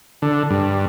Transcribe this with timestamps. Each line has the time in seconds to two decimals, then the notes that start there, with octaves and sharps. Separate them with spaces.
0.22 D3
0.51 G2